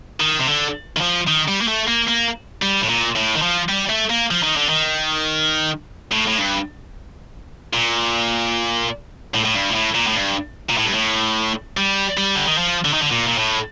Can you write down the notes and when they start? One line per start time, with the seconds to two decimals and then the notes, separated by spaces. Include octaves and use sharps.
0.20 D#3
0.39 C3
0.47 D3
0.97 D#3
1.01 F3
1.28 D#3
1.48 G3
1.61 A#3
1.68 A3
1.88 A#3
2.09 A#3
2.62 G3
2.82 A2
2.89 A#2
3.16 A2
3.35 D#3
3.42 F3
3.69 G3
3.89 A3
4.10 A#3
4.31 F3
4.43 D#3
4.57 D3
4.69 D#3
6.12 A2
6.28 A2
6.38 G2
7.74 A#2
9.34 A2
9.45 A2
9.55 G2
9.70 A#2
9.75 A2
9.95 A#2
10.07 A2
10.15 G2
10.69 A#2
10.77 A2
10.85 G2
10.93 A2
11.77 G3
12.17 G3
12.35 D3
12.46 D#3
12.57 F3
12.85 D3
12.93 D#3
13.02 D3
13.11 A#2
13.28 A#2
13.38 A2